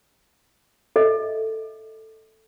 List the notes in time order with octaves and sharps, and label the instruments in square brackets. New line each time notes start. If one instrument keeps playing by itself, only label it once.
[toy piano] A4 D#5 E5